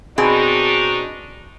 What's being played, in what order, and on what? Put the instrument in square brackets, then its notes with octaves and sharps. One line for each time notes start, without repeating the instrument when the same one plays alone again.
[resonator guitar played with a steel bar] B2 C4 G#4 [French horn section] D4 D#4 [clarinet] F#4